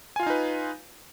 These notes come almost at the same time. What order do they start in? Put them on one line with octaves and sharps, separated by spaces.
G#5 F4 F5 D#4 B4